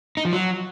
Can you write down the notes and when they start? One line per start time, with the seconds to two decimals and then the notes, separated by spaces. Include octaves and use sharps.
0.17 D#4
0.25 F3
0.33 F#3